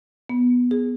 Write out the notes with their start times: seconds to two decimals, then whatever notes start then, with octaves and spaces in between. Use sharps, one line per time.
0.30 B3
0.71 G#4